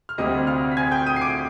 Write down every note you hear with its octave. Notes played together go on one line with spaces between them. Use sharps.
F6
D2 C3 G3 C4 D#5 D#6
F5 F6
B6
G#5 G#6
G5 G6
D#6 D#7
C7
D6 D7